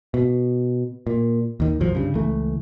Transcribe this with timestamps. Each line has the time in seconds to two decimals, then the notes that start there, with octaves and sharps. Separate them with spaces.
0.14 B2
1.07 A#2
1.60 D#2 D#3
1.80 C2 F#2 F3
1.95 G2 C#3
2.15 C#2 E3 A3